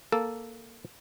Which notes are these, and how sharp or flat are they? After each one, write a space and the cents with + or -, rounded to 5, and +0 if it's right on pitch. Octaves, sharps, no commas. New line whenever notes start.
A#3 +0 A4 +0